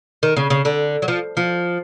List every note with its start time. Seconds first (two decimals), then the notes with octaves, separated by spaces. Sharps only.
0.23 D#3
0.37 C#3
0.50 C#3
0.65 D3
1.02 F#3
1.08 F3
1.37 F3